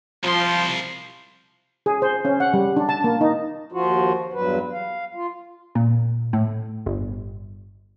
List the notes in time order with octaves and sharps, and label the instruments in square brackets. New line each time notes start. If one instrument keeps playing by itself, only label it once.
[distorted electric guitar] C2 C6 [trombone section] F3
[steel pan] G#4
C5
C#4
F#5
G3
D4
A5
A#3
D#4
[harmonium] D#2 F3 F4 F#4
E2 G2 F#3 B4
F5
F4
[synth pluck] A#2
A2
G1